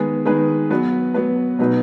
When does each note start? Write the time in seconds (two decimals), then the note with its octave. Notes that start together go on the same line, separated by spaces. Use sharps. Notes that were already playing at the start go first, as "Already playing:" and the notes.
Already playing: D#3 G#3 B3 G#4 B4
0.25 D#3 G#3 B3 G#4 B4
0.70 F#3 B3 F#4 B4
1.14 F#3 B3 F#4 B4
1.59 B2 F#3 D#4 B4